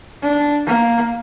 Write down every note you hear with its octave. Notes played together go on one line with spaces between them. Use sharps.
D4
A#3